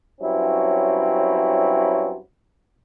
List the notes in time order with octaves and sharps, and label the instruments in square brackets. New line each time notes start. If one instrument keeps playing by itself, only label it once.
[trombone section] G2 F#3 C4 C#4 E4